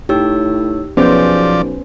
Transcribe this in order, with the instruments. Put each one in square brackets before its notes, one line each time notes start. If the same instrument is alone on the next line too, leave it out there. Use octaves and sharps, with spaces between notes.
[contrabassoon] A2 [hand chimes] D#4 C#5 E6 [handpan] G4
[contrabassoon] B1 [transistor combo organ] F3 D5 [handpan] B3 C#4 C5 [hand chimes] G#4 G6